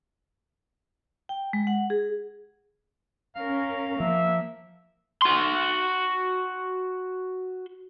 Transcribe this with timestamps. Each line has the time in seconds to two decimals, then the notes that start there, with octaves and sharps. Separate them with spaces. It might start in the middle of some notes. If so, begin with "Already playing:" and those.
1.29 G5
1.53 G#3
1.67 F#5
1.90 G#4
3.36 C#4 A#4 F5
4.00 F3 A#3 E5
5.22 F#4 C6